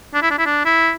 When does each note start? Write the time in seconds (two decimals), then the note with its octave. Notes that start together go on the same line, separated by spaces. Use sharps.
0.14 D4
0.22 E4
0.30 D4
0.38 E4
0.46 D4
0.65 E4